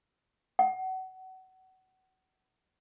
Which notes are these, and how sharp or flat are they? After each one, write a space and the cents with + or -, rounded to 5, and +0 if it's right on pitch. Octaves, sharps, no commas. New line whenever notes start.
F#5 +25